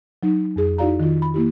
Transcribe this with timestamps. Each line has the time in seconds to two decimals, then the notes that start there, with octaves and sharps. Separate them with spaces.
0.23 F#3 D#4
0.56 F2 G#4
0.78 D#4 E4 F#4 D5 F5 A#5
1.00 D#3 F4
1.22 B5
1.34 A#3 E4 G4